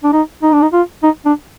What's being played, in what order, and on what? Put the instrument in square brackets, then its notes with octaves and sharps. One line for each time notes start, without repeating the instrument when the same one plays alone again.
[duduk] D4
D#4
D#4
D4
D#4
F4
D#4
D4